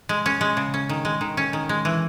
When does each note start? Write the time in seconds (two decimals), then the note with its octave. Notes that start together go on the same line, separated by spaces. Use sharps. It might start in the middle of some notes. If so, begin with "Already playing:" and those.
0.09 G#3
0.26 C#4
0.41 G#3
0.57 C#3
0.74 C#4
0.89 D#3
1.05 G#3
1.21 D#3
1.37 C#4
1.53 D#3
1.69 G#3
1.85 E3